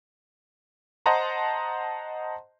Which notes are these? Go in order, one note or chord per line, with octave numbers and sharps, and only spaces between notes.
C5 D#5 F#5 A5 A#5 C6